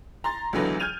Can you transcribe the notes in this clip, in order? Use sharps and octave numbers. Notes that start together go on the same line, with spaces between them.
A#5 C6 A6
C#2 D3 E3 F#3 A3 B3
F6 G6 G#6 D#7 F7